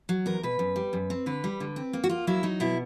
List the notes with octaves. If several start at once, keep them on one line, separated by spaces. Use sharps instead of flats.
F#3
E2 A#4
B2 B4
F#2
G3
F#2
C4
D3 B4
G3
D3
C4
A#3
F#4
A#3 F4
F#3 E4
F#3 D#4
B2 E4